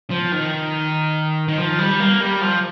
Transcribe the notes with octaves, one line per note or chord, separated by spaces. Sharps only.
F3
D#3
D#3
F3
G3
A#3
G3
F3